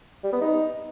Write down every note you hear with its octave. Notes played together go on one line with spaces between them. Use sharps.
G3
B3
D#4